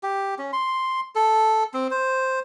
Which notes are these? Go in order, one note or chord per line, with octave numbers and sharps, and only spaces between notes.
G4
C#4
C6
A4
C4
C5